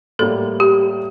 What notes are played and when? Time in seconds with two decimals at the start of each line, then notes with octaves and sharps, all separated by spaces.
0.19 A2 G3 A#3 A4
0.60 G4